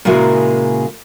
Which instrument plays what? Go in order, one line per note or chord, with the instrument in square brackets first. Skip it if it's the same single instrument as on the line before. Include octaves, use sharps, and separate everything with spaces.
[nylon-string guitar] A#2 C#3 G#3 E4 F#4 A#4